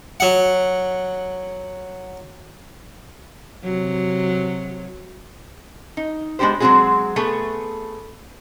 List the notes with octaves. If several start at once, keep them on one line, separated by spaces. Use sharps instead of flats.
F#3 F#5
C3 F#3
D#4
G#3 B3 D4 G4 C5
F#3 G#3 A3 C4 F#4 G#4
A3 B3 G#4